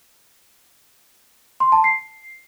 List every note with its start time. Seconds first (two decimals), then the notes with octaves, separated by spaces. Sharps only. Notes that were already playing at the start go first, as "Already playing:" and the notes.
1.60 C6
1.72 A5
1.84 C7